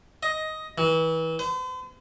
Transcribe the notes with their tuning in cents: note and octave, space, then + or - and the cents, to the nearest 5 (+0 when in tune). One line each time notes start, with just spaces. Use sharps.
D#5 +10
E3 -30
C5 -45